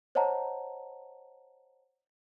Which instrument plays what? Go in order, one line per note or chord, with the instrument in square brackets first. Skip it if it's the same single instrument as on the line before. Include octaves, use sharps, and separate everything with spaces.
[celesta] C5 C#5 D#5 F#5 A5 A#5